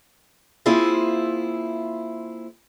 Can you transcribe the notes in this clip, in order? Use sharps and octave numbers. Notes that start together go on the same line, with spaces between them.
A#3 C4 E4 F4 G#4 E5